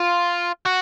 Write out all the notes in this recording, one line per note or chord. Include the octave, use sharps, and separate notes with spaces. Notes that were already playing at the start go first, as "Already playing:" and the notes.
Already playing: F4
F#4